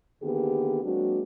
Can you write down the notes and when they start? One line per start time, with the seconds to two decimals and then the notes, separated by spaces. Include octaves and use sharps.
0.23 D3 D#3 A#3 B3 G4 G#4
0.84 F#3 G#3 A#3 C4 D4 F#4